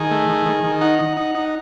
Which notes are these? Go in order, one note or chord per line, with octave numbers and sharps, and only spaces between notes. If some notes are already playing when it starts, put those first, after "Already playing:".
Already playing: D#3 G#4
A3
D#3
D#3
D#3
D#4 F#5
D#4
D#4
D#4